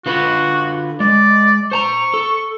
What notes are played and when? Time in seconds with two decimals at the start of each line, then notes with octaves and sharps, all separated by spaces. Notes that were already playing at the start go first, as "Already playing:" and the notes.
0.06 D3 F4 F#4 B4
1.00 G#3 D5
1.72 C5 A5 A#5 C#6
2.14 A4